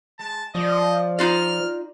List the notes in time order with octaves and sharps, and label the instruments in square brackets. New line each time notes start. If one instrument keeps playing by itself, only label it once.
[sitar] G#3 [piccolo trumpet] A5
[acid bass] F3 [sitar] D5 [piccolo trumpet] D#5
[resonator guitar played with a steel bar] D#4 F4 D5 [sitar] A#4 [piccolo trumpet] F6